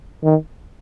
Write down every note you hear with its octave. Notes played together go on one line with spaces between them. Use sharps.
D#3